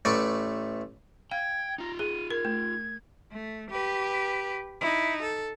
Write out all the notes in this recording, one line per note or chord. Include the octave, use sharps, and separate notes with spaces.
A1 A3 B4 D5 C#6
F5 G5 G#6
D#4 F4 A#5
G#4 D#7
A#4 G#6
A3
A3
G4 B4
D#4 E4
A4